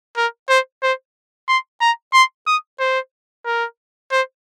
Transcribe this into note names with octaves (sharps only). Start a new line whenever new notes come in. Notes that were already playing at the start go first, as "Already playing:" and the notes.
A#4
C5
C5
C6
A#5
C6
D#6
C5
A#4
C5